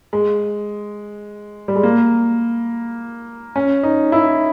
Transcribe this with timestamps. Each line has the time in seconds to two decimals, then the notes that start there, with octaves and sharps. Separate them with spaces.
0.13 G#3
1.68 G3
1.76 G#3
1.83 A#3
3.56 C#4
3.83 D#4
4.12 E4